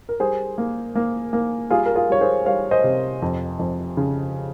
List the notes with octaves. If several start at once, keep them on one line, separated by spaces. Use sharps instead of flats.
A#4
G3 G#4 C5
A#3
A#3
A#3
G3 F4 G#4
A#4
F4 G#4
G3 C#5
G#4 C5
G3 C#5 F5
C5 D#5
C3
F2
F2
C#3